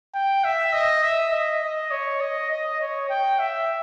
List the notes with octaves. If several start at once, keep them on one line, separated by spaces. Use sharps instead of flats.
G5
E5
D#5
E5
D#5
D#5
C#5
D#5
D#5
C#5
G5
E5